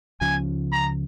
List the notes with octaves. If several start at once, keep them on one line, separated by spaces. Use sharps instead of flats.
C#2 C#3 F3 G#5
A#5